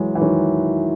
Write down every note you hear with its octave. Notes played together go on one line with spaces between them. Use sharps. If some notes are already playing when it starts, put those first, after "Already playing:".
Already playing: E3 F#3 G#3
E3
D#3 F#3